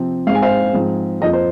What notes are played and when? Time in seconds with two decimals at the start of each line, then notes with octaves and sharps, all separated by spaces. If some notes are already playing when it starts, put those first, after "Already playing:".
Already playing: C3 F3 C4
0.27 G#2 G#3 C4 F5
0.35 G#5
0.42 C5 F5
0.74 G#2 F3 C4
1.21 F2 F3 A#3 D#5
1.33 C5